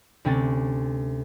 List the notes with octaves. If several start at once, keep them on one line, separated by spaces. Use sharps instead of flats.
D2 C3 C4 C#4 A6